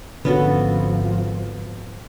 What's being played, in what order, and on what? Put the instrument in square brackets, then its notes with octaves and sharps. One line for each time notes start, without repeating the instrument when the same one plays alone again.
[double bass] G#1 F3 [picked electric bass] D3 C#4 [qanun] B3 F#4 A4